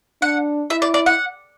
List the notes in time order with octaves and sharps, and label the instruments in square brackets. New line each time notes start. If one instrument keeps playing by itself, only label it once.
[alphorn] D4 [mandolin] F#5
[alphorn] E4 [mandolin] E5
[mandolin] D5
D5
F#5